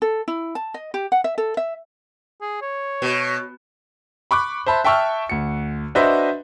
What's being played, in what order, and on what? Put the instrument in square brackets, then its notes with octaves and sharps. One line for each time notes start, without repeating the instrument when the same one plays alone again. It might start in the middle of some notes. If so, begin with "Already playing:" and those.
[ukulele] A4
E4
A5
D#5
G4
F#5
E5
A4
E5
[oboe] G#4
C#5
[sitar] B2
[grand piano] B5 C#6 D6 F#6
C5 E5 A5 B5
E5 G5 A5 C#6 E6 F6
D2 C#7
D4 F#4 B4 C5 D#5 E5